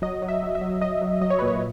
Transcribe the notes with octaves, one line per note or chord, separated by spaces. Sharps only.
F#3 D#5
F#3
E5
F#3
E5
F#3
F#3 D#5
F#3
F#3 D#5
C#5
A#2 B4
C#5